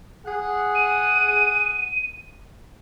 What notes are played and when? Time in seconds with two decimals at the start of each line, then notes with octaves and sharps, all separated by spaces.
0.24 G#4 F#5
0.75 D#7